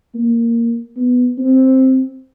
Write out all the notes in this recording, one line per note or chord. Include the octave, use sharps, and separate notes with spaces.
A#3
B3
C4